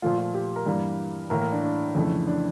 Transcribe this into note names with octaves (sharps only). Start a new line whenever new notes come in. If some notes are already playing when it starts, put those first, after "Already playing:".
A#2 F3 A3 F4
F4
G4
A#4
G2 E3 G3 A#3
A2 E3 A#3 A#4
A#4
D4
D4
F2 C#3 E3 A3
D4